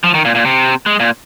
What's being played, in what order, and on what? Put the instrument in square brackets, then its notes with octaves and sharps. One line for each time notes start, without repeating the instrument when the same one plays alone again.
[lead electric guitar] F3
D#3
A#2
A#2
C3
G#3
A#2